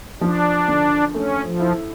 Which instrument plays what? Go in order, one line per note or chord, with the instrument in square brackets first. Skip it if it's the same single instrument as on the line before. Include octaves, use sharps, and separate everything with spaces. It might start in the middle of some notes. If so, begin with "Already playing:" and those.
[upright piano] F3 [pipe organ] D4
[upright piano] D3
[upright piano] A3 [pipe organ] C#4
[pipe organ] F3
[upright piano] E4